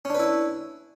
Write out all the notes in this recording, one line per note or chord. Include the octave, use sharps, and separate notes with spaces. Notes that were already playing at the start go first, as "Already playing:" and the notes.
C#4 D4 E4 B4